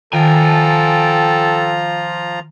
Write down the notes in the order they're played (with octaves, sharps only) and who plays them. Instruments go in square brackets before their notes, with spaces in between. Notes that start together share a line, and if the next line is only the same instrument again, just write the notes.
[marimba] D#3 [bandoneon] F3 F4 A#5 [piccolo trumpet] A4 [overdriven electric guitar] G5 G#5